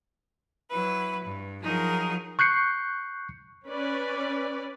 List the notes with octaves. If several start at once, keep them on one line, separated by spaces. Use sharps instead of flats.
F#3 E4 B4
G2
F3 F#3 D#4 G#4 A#4
C#6 F#6 G6 C7 C#7
C#4 B4 D5